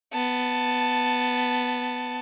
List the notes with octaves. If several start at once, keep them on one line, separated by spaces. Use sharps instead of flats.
B3 A5